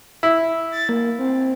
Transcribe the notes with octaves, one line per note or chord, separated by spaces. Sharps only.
E4
A6
A#3
C4